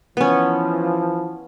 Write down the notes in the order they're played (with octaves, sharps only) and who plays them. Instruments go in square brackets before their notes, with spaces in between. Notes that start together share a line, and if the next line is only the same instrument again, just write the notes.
[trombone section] E3 F3 [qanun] B3 C#4